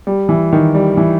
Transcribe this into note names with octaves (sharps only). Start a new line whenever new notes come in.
G3
E3
D#3
G3
E3